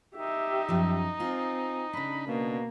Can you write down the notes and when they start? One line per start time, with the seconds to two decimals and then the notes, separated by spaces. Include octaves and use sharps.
0.16 D#4 G4 E5
0.68 F#2 F3
1.20 C4 F4 G#4
1.93 C#3 D4 B5
2.27 B2 A#3